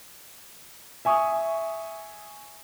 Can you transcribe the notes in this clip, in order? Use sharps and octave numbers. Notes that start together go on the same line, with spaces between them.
E5 G#5 C#6 D#6